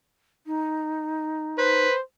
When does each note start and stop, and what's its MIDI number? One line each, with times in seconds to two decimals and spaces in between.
0.46 1.87 63
1.58 1.93 71
1.58 2.01 72